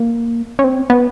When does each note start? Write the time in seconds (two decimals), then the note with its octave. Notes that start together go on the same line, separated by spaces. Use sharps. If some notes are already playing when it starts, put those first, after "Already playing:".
Already playing: A#3
0.59 C#4
0.64 C4
0.90 B3